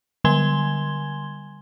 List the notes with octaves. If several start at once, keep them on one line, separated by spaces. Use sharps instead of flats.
D3 G3 G#5 C6 G#6 G7